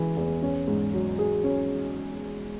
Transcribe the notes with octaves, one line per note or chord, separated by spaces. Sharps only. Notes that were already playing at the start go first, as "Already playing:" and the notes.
Already playing: C#3 E3 G#3
E2
C#4
G#2
F#3
G#4
C#4